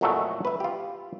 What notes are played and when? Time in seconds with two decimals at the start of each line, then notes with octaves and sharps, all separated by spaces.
0.01 F2 A#2 E3 F#3 G#3 A3
0.45 B4 E5
0.60 F4 G4